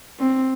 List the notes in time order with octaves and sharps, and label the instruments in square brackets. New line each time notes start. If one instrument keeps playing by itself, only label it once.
[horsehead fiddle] C4